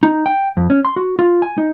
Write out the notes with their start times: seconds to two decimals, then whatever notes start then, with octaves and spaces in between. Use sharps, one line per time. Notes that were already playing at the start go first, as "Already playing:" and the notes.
0.03 D#4
0.26 G5
0.57 F2
0.70 C#4
0.85 C6
0.96 F#4
1.19 F4
1.42 G#5
1.58 D#4